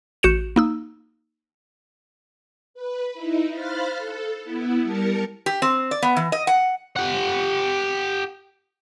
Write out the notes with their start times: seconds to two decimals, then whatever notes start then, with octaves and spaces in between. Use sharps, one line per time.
0.23 A1 F#4 G6 C#7 E7
0.56 A#3 D#4 E6
2.74 B4
3.14 D#4 E4
3.53 C5 F5 B5 F6 F#6 A6
3.97 A4
4.44 B3 E4
4.83 G3 A#4 A5 C#7
5.46 G4
5.62 C4
5.91 D5
6.02 B3
6.16 E3
6.32 D#5
6.47 F#5
6.96 G4 F#5